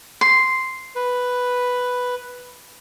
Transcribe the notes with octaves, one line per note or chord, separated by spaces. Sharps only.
C6
B4